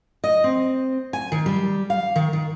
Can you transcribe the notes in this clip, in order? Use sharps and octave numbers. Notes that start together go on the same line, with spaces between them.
D#5
C4
G#5
D#3
G3
F5
D#3
D#3